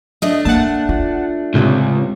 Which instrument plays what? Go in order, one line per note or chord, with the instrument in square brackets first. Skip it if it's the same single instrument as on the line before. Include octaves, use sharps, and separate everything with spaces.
[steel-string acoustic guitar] A3 D4 [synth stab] D#5
[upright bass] A#3 [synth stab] F#5 A5
[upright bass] F4
[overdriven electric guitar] C#2 [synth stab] A2 C3